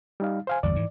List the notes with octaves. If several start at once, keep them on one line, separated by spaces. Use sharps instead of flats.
G3 D#4 F5
C5 F5 G#5
G1 E2 G2 D5
G#2 B2 E3